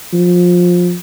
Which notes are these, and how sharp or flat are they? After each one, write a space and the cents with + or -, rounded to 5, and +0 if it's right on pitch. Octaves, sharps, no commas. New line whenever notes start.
F3 +20